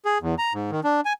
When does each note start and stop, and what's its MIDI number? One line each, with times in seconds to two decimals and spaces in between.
0.05 0.18 68
0.21 0.35 40
0.39 0.53 82
0.54 0.71 44
0.71 0.80 51
0.84 1.01 62
1.05 1.13 80